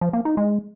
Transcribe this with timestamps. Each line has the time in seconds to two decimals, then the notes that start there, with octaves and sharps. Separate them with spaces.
0.01 F3
0.13 A#3
0.25 D#4
0.37 G#3